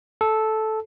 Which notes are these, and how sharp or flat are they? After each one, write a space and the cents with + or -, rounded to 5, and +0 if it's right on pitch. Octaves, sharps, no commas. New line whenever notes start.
A4 -10